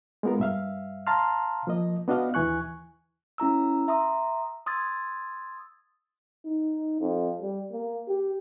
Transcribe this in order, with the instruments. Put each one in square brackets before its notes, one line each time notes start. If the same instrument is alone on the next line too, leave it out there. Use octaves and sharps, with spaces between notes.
[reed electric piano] G#3 A#3 B3 F4 A#4
G2 E5 F5
F5 A5 A#5 C6 F6
F3 A#3 D#5
B3 D4 F#4 D#5 F5
D#2 E3 G#5 C#6 F#6
[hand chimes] C#4 E4 A#5 E6
E5 A#5 C6 D#6
C6 D#6 E6 G#6 A6
[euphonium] D#4
F2
G3
A#3
G4